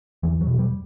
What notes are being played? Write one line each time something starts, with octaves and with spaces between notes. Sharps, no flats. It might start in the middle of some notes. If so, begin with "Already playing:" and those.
E2 E3
F#3
B2
G3